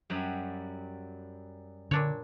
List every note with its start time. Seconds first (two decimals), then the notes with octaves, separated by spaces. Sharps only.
0.10 F#2 F#3 G3
1.91 A#2 D3 D4 C#5